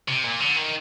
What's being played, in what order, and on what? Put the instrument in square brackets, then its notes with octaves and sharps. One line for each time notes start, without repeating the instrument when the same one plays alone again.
[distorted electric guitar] C3
A#2
D3
D#3